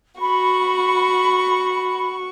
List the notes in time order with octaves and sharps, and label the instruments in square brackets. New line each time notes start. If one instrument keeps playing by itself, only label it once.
[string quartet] F#4 C#6 [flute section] B5